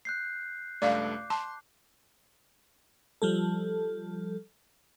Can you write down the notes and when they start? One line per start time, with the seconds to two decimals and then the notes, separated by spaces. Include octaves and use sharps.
0.05 F#6 G6 C7
0.82 C#2 G2 A3 D5 F5 D6
1.30 A5 C6
3.22 F3 G3 A4